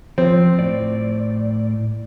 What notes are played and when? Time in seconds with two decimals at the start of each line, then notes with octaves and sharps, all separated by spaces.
0.18 F3 C4
0.59 A2 D5